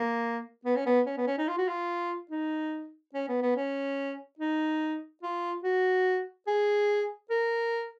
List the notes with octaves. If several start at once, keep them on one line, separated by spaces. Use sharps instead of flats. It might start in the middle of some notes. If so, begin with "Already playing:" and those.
Already playing: A#3
B3
C#4
B3
C#4
B3
C#4
D#4
F4
F#4
F4
D#4
C#4
B3
B3
C#4
D#4
F4
F#4
G#4
A#4